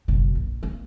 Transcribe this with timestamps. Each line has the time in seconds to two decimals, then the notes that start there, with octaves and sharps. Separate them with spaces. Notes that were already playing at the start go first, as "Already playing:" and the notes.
0.08 F#1 B2
0.35 A#1
0.63 A#3